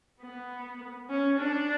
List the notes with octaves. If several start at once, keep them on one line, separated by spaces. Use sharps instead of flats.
B3
C#4
D4